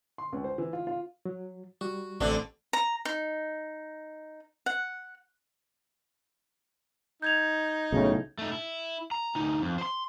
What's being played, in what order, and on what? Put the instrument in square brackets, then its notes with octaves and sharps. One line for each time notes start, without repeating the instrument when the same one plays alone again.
[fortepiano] C6
C#2
C5
E3
F4
F4
[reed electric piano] F#3
[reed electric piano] G3 [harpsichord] F#4
[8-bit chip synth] A1 [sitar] D3 D4 [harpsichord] A3 C4 F#5
[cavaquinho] A#5
D#4
F#5
[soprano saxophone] D#4 [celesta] G6 G#6 F7
[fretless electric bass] B1 A2 [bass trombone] C#3
[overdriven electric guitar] A3 D#4
E4
A#5
D2 D#4
F2
C5 C6